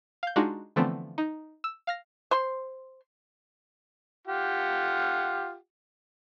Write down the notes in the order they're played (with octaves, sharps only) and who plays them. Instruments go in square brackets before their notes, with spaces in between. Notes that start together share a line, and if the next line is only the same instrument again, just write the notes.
[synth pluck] F5 G6
G#3 D4 D#4 F4 F#4
D3 E3 F3 A3 B3 C4
D#4
E6
F5 F6 A#6
[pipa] C5 C6
[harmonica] F4 G4 F#5